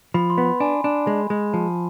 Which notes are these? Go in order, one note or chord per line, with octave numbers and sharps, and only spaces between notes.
F3 B5
C6
B3
B5
D4 G#5
D4
G#3
G#3
F3 A5